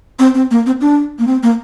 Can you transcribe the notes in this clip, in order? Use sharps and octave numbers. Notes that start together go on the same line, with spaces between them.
C4
C4
A#3
C4
D4
A#3
C4
A#3